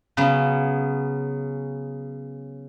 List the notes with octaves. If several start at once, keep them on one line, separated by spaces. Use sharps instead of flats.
C#3 F#3 B3 C#4